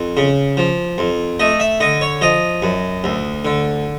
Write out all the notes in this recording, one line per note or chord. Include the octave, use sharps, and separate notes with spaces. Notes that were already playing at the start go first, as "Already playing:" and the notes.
Already playing: F2
C#3
F3
F2
A3 D#5
E5
D3 D#5
C#5
F3 D#5
F#2
D2
D3